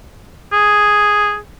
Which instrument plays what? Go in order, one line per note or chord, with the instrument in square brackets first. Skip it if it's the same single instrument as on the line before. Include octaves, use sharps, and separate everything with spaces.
[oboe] G#4